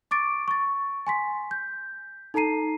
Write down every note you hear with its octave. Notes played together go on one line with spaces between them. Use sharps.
C#6 D6 A6 D7
C#6 A6
G#5 C6 B6
G6
D#4 A4 A5 A#5 C7 D#7